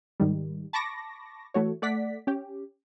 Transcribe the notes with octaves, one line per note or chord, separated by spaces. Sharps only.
G#2 D#3 G3
A5 B5 C#6 D6 A#6
E3 A3 F#4 C#5
A3 D5 F#5 B6
C#4 G4